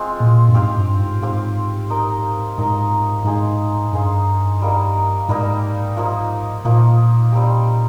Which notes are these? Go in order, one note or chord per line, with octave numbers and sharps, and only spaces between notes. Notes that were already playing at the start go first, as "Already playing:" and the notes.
Already playing: G#3 C4 F4
A#2
G2
G#2 C4 G4 C5 F5
G2
G#2
G#2 C4 G4 C5 F5
D#4 A#4 D#5
G#2 D#4 A#4 D#5
G#2 D#4 G#4 C5 F5
G2 D#4 G#4 C5 F5
G3 A#3 D#4
G#2 G3 A#3 D#4
F3 A#3 D#4
A#2 F3 A#3 D#4
G3 C4 D#4 G4